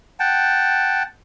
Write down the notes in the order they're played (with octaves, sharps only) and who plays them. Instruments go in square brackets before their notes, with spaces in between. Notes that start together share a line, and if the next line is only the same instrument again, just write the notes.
[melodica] F#5 G5 A5